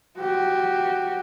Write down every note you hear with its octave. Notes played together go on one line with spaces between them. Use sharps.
F#4 G4